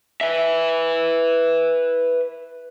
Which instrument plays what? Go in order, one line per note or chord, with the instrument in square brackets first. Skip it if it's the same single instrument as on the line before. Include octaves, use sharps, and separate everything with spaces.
[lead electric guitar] B4 E5